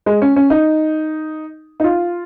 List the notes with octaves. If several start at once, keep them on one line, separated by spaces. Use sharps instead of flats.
G#3
C#4
C#4
D#4
D#4
F4